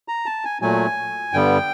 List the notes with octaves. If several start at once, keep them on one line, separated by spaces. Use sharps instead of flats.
A#5
A5
G#5
A#2 F#3 A3 G#5
G2 D3 G3 B3 G5